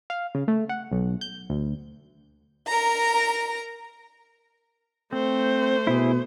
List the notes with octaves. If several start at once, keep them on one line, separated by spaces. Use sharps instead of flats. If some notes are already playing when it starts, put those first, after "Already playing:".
F5
C#3
A3
F#5
B1
G6
D2
A#4 A#5
A3 C4 C5
B2 E4 G#4